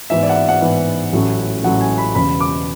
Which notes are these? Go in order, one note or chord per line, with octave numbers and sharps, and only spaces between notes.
G#2 E3 B3 E5
D5
F#5
E5
F#5
G#2 E3 B3
A1 A2 F#3 A3 C#4
A1 A2 F#3 A3 C#4 F#5
G#5
B5
E1 E2 C#3 B5
D6